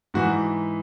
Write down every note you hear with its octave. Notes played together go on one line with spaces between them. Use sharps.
G#2 E3 F#4